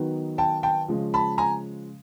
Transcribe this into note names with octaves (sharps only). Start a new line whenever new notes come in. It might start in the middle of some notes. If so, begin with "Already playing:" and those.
Already playing: D#3 F#3 B3 D#4
G5 A5
G5 A5
C#3 F3 G#3 C#4
A5 B5
G#5 A#5